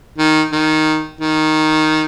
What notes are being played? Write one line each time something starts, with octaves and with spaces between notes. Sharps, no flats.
D#3
D#3
D#3